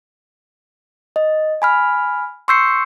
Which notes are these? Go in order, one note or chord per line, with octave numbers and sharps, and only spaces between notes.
D#5
G#5 B5 F6
C6 C#6 E6 G6 C7 C#7